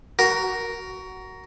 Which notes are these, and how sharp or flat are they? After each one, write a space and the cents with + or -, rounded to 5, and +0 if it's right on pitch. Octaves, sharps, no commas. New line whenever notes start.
F#4 +15 A#4 +0